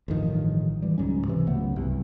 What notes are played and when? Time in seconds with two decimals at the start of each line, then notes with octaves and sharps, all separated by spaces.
0.08 A1 G2 D#3 F3
0.82 E3 G3
0.98 C#2 G#2 F#3 C#4
1.28 C3 E3
1.47 C#2 F#3 A3 B3
1.76 C2 G2